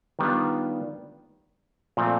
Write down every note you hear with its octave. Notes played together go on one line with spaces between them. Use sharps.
D#3 G3 B3 D4 F4
A#2 F3 A3 C4